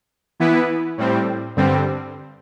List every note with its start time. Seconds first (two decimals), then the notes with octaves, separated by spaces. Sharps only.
0.40 E3 B3 E4 B4
0.98 A2 G3 C4
1.56 G2 D3 G3 C4